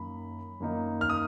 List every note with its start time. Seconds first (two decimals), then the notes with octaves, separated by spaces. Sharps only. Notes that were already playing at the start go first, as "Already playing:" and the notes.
Already playing: F#2 D#3 A#3 B5
0.60 F#2 D#3 A#3 D#4
1.01 F6
1.10 D#6